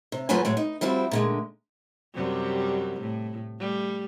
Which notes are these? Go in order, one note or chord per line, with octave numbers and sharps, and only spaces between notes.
C3
F#2 F3 F#3 A3 B4 G#5
A2 F#3 G#3
D#4
F3 G3 C4 E4 F#4
A#2 D3 G#3
F#2 C3 G3
A2
G3 A3